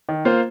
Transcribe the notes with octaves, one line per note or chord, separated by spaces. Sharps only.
D#3
A#3 F4 C5